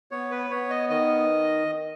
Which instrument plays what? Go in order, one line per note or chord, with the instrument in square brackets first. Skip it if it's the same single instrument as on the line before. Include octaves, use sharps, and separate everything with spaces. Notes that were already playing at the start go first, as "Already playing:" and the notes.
[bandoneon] B3 C#5
B4
B3 C#5
D#5
D#3 D#5